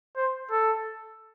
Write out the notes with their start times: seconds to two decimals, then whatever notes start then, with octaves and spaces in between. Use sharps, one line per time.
0.16 C5
0.51 A4